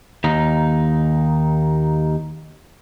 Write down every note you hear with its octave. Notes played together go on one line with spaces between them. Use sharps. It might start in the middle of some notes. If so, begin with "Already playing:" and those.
D#2 D#4